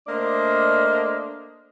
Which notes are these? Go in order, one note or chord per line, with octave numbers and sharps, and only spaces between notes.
A3 A#3 D4 C5 D5 D#5